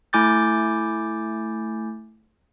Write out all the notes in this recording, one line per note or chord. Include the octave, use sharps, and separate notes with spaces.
A3 E4 G#5 D6 G6 A6